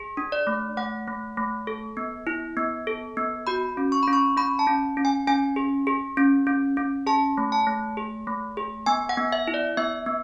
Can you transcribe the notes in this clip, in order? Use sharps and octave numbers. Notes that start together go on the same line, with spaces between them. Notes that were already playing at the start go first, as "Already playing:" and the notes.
Already playing: G#4
D4
D5
A3
A3 F#5
A3
A3
A4
B3
E4
B3
A4
B3
F#4 B5
C#4
C#6
C#4 B5
C#6
C#4 B5
A5
C#4
C#4
G#5
C#4 G#5
G#4
G#4
C#4
C#4
C#4
G#4 A5
A3
A5
A3
G#4
A3
G#4
B3 G#5
F#5
B3
E5
E4
D5
B3 E5
B3